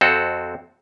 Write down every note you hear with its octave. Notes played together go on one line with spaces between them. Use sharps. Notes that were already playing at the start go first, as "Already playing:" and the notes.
F2 C4 F#4 A4